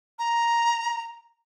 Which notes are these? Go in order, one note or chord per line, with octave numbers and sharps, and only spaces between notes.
A#5